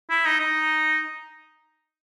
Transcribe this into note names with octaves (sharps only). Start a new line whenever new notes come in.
E4
D#4
D#4